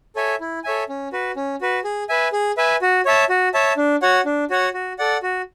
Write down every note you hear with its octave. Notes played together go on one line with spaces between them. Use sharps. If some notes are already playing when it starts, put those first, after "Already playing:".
A4 C#5 E5 G#5
E4
A4 C#5 E5 G#5
C#4
F#4 B4
C#4
F#4 B4
G#4
B4 E5 G#5
G#4
B4 E5 G#5
F#4
C#5 E5 A5
F#4
C#5 E5 A5
D4
F#4 C#5 F#5
D4
F#4 C#5 F#5
F#4
A4 D5 F#5
F#4